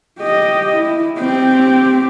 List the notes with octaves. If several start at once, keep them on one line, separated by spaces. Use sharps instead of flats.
G4 D#5
E4
C4 G4